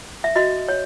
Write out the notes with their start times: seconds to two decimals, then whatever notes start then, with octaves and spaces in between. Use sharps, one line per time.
0.24 E5
0.36 F#4 D#5
0.68 C#5